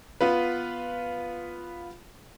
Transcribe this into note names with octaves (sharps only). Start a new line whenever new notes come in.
B3 F4 B4